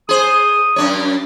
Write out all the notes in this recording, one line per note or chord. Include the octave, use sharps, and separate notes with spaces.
G#4 C5 D#6
F#2 D4 C#5